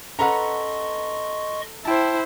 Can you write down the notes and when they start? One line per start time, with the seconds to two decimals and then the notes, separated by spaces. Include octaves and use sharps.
0.19 C#4 A4 B4 D#5 F#5 A#5 C6 C#6
1.85 E4 C5 G5 A5